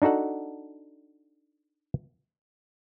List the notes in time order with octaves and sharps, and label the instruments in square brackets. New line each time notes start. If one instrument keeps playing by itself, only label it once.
[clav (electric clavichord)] D4 D#4 F#4 A4 F#5